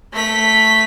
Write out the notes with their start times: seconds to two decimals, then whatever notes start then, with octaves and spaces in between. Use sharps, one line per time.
0.13 A3 B6